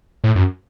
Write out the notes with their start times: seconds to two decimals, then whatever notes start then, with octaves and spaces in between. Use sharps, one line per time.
0.24 A2
0.35 F#2